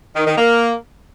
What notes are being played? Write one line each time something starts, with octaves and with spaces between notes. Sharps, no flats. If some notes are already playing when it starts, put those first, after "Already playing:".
D#3
D#3
A#3